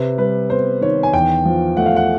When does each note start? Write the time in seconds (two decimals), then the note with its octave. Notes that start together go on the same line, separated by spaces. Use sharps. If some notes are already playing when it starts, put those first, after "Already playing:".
Already playing: C3 B4
0.18 G3 B4
0.50 B3 C5
0.81 D#3 C#5
1.03 G#5
1.13 E2 G5
1.45 F3
1.77 A3 F#5
1.86 F5
1.96 F#5